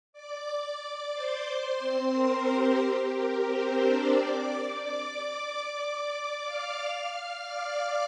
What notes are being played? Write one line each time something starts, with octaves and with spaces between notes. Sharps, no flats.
D5 D6
D5 D6
D5 D6
C5 C6
C5 C6
C4 C5
A#4
G4
G4
A#4
C4 C5
D4 D5
D5 D6
D5 D6
F5 F6
D5 D6